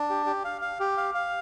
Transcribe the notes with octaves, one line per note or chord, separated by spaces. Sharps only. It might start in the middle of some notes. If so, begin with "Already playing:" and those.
Already playing: D4
G4
G4
F5
F5
G4
F5
F5